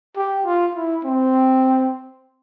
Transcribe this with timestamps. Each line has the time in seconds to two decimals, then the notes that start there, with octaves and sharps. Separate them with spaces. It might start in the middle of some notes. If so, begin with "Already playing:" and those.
0.17 G4
0.45 F4
0.75 E4
1.05 C4